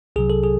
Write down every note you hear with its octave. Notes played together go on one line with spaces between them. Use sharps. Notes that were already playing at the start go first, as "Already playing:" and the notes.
C2 C3 F#3 G#4
A4
G#4